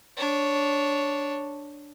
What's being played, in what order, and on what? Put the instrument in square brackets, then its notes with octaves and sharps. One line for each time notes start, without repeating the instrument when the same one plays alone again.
[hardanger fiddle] D4 C#5